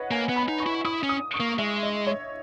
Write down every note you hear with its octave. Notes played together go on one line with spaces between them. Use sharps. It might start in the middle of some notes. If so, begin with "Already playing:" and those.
Already playing: B4 C#5 D#5 F#5
A#3 G#5
B3
B5
D#4
C#6
E4
E4 D#6
C#4
D#6
C#6
A#3
G#3 E5
D#5
C#5